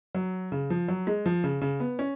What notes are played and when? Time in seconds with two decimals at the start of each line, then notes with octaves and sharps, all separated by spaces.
0.15 F#3
0.52 C#3
0.70 F3
0.88 F#3
1.07 G#3
1.26 F3
1.44 C#3
1.61 C#3
1.80 B3
1.99 C#4